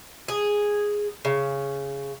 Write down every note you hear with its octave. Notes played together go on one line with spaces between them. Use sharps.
G#4
C#3